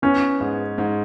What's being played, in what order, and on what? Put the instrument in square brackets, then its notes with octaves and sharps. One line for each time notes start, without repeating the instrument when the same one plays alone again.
[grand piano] B3 [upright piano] C#4
[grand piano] G#2
G#2